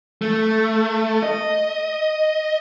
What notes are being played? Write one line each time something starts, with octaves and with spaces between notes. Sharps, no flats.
A3
D#5